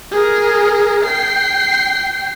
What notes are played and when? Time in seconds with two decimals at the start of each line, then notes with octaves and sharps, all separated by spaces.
0.11 G#4 A#4
1.04 G5 C7